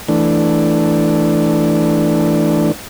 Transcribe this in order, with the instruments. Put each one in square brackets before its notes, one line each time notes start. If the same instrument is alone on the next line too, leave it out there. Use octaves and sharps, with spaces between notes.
[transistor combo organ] E3 A3 D4